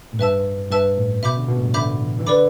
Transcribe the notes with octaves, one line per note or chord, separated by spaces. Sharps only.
A2
G2 B4 E5 A5 E6
G2 B4 E5 A5 E6
A2
B2 E5 B5 D6 G6
D3
B2
A2
G2
D3 E5 B5 D6 G6
E3
E3
D3 B4 D5 B5 D6